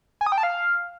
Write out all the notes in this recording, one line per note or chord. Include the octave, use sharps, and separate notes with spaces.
G#5
D#6
G5
A5
F5